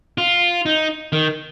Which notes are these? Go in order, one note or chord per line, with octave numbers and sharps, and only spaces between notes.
F4
D#4
D#3